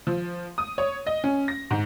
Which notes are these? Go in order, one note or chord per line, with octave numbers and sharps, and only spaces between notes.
F3
D#6
C#5
D#5
C#4
A#6
G#2